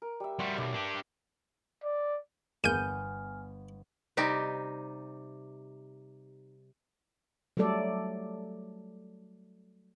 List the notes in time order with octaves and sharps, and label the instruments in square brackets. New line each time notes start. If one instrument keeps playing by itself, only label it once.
[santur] A#4
G3 E5
[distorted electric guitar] G3 F#4 [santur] C5
[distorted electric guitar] B1 [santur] D5
[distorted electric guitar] D4 G4
[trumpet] D5
[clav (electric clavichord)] G1 B3 [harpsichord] E2 A#3 [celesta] G#5 F6 [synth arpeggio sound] G6 D#7
[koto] C3 G3 D#4 G4
[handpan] F#3 G3 A3 A4 D5